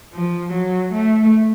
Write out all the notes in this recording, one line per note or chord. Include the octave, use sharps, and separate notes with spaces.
F3
F#3
A3